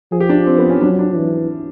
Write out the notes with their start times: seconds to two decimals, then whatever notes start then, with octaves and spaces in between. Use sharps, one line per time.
0.12 F3 G#4
0.20 G4
0.29 D4
0.47 C4
0.58 B3
0.70 C#4
0.81 F#3 D4
0.99 D4
1.16 E3